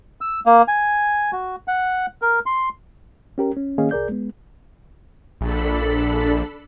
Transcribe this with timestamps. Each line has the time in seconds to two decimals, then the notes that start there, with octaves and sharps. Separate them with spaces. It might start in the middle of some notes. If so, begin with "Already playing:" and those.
0.21 E6
0.46 A#3
0.68 G#5
1.32 F#4
1.68 F#5
2.22 A#4
2.46 C6
3.38 C#4 G4 A#4
3.57 C#4
3.78 D#3 A#3 C#4 G#4 D#5 F5
3.91 C2 G#4 A#4 D5 G6
4.09 G#3 B3
5.41 A#1 D4 A4 B5